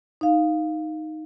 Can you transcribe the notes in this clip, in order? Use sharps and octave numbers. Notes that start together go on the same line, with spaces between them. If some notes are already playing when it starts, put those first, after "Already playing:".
D#4 F5